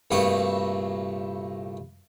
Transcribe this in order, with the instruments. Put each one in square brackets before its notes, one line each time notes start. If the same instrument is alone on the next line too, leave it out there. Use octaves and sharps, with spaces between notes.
[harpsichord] C2 G2 A#2 A3 F#4 D#6